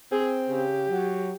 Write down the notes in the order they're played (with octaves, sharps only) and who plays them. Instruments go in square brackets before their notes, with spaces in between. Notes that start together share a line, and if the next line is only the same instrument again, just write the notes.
[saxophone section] C4 [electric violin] G#4
[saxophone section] C#3 [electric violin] G4
[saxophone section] F#3